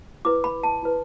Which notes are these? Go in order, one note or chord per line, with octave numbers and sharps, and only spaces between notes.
E4 B4 D6
B5
A5
E4 B4